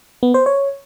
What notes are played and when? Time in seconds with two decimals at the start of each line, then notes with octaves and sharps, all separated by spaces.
0.23 B3
0.34 C5
0.46 C#5